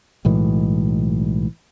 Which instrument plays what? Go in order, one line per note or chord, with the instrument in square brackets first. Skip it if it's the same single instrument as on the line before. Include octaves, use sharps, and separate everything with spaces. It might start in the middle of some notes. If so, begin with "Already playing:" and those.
[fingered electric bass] B1 A2 E3 G#3